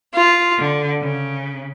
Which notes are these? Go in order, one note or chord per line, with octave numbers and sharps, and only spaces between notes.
F4
D3
C#3